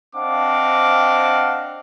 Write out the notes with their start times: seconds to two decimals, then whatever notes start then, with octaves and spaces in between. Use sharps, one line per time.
0.15 C4 D4 D#5 F5 F#5 D6